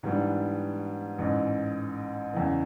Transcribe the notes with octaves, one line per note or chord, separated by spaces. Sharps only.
G#2 E3 G3 B3 D4
A1 G#2 E3
E2 C#3 E3